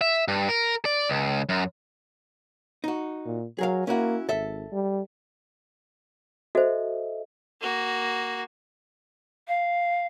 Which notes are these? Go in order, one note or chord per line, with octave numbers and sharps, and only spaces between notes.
E5
G2
A#4
D5
C#2
F#2
D#4 F#4
A#2
F#3 G#4 A#4 F5
A#3 C#4 E4 F#4
G#1 A4 E5
G3
F#4 A4 C5 D#5 E5
A#3 F#4
F5